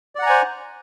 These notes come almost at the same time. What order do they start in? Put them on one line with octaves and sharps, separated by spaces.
D5 F#5 A#5 G#5 C5